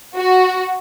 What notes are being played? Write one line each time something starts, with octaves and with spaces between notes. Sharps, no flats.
F#4